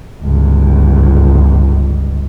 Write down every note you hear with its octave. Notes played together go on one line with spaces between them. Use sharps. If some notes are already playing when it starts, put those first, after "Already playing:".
G1 C#2